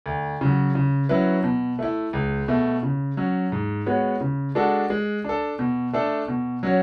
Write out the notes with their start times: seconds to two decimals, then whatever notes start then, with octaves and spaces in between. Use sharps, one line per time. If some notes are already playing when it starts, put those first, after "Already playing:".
0.06 D2
0.41 C#3 F#3
0.75 C#3
1.09 F#3 C#4 E4 B4
1.44 B2
1.79 A3 E4
2.13 C#2
2.48 B2 A3
2.83 C#3
3.17 F#3 C#4
3.52 G#2
3.86 G#3 B3 F#4 C#5
4.21 C#3
4.55 G#3 D4 F#4 A4
4.90 G#3
5.24 D4 A4
5.59 B2
5.93 A3 D4 A4
6.28 B2
6.63 F#3 C#4 F#4 C#5